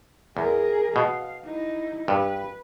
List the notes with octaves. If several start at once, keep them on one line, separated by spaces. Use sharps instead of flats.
E2 G#4 A#4
B2 F5
D#4 E4
G2 B4